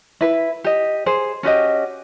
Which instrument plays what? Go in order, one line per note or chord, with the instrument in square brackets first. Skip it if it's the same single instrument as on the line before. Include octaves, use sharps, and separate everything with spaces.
[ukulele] E4 B4
G4 D#5
G#4 C5
C#4 F#4 G4 D#5